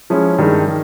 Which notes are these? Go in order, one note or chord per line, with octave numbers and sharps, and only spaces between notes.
F3 G#3 C#4 E4
G2 D#3 G#3
D#3